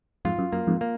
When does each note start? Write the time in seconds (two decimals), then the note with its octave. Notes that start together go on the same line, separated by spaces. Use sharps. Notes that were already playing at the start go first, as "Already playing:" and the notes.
0.25 F2 G#2 F4
0.39 F#2
0.52 F#2 A#3
0.67 F2 G#2
0.81 A#3